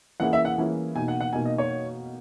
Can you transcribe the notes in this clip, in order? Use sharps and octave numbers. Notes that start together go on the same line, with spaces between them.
E3 A#3 C#4 E4 G#4 F#5
E5
F#5
E3 A#3 C#4 E4 G#4
B2 A#3 D#4 G#5
F#5
F#5
B2 A#3 D#4 G#5
D#5
C#5